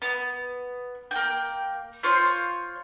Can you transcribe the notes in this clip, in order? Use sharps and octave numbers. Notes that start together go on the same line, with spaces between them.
B3
A#3 G5
F4 C5 C#5